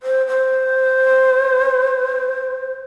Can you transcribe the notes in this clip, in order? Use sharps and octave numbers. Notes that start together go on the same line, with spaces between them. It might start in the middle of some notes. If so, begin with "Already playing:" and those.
C5
C5